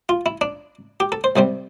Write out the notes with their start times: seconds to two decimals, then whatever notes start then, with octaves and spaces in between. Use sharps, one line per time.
0.09 F4
0.26 E4
0.41 D4
1.00 G4
1.12 A4
1.24 C5
1.36 C2 C3 G3 C4